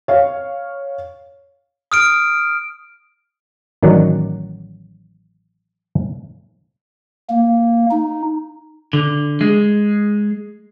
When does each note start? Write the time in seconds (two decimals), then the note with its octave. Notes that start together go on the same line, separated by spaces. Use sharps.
0.08 C#5 F5
1.92 D#6 F6 D7
3.83 A1 D#3 F#3 D5 F#5
7.29 A#3
7.91 D#4
8.93 D3
9.41 G#3